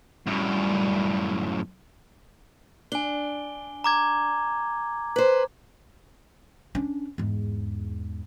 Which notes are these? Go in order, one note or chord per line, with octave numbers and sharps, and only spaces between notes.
F#2 A2 G3
D4 G#5 G7
A#5 D6 G#6
B4 C5
C#4 D4
E2 G#2